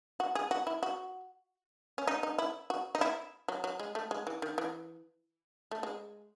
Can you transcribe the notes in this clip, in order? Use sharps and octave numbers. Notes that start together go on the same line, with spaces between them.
F#4
G#4
F#4
E4
F#4
C#4
D#4
D#4
E4
F#4
D#4
E4
F#3
F#3
G#3
A3
G#3
E3
D#3
E3
A3
G#3